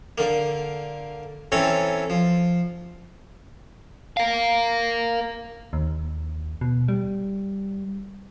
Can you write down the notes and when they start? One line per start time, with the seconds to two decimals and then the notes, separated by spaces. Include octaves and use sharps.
0.18 D3 A#3
1.52 E3 C4 C#4 A4 C#5 A#5
2.10 F3
4.17 A#4 F5
5.73 D#2
6.61 B2
6.88 G3